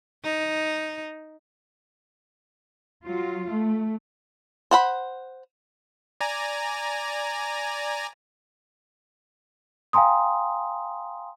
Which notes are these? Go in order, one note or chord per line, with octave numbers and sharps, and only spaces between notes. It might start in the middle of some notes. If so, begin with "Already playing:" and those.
D#4
F#3 F4
A3
C5 F#5 B5
D5 G#5 A#5
F5 G5 G#5 A#5 C6 D#6